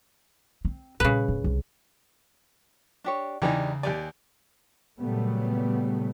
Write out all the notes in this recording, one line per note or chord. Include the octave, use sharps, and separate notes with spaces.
C4
A#2 C#3 G3 B4
D1
C2
D4 G4 C#5
E2 C#3 E3 D4 D#4 G4 A#5
D#2 G4 D5 G#5
A#2 C#3 F#3 G3 A3 B3